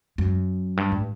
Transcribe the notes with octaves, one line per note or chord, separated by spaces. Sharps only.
F#2
G2
A2